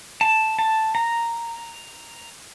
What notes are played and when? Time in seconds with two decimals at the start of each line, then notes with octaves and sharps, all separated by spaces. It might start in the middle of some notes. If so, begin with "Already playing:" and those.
0.21 A5
0.59 A5
0.95 A#5